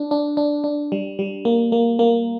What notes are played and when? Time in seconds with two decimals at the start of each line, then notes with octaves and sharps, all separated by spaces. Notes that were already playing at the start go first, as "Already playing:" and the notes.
Already playing: D4
0.11 D4
0.37 D4
0.64 D4
0.92 G3
1.19 G3
1.45 A#3
1.72 A#3
1.99 A#3